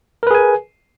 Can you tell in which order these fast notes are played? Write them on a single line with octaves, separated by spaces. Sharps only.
A#4 B4 G#4 G#5